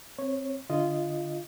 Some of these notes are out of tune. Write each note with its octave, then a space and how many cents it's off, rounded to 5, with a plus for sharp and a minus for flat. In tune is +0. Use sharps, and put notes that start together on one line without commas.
C4 +15 C#5 -10
D3 -5 F4 -15 D#5 +0